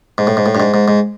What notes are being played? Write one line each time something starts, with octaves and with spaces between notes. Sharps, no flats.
G#2
A2
G#2
A2
G2
G#2
G#2
G#2